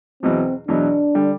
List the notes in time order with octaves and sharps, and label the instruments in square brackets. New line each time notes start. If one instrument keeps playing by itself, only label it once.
[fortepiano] E2 B2 F#3 [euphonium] C4
[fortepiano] E2 B2 F#3 [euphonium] D4
[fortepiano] D3 G3